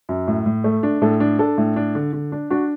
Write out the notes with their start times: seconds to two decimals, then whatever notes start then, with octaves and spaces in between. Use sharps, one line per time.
0.09 F#2
0.27 A2
0.46 A2
0.64 A3
0.83 D4
1.02 A2 A4
1.20 D4
1.39 D4 A4
1.58 A2
1.76 D4
1.95 D3
2.13 D3
2.32 D4
2.50 D4 F#4